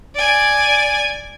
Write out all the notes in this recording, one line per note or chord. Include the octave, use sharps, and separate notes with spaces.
D5 G#5